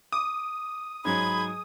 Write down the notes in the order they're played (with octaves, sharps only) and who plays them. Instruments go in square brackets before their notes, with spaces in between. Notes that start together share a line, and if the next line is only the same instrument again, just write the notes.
[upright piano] D6 [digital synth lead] D#6
[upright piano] G#2 F#3 [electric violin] G#4 G#6 [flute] B5